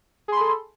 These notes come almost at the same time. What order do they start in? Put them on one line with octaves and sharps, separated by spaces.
G#4 C6 B5 A4